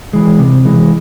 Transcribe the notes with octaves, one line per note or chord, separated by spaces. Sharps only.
E3 G#3
C3
E3 G#3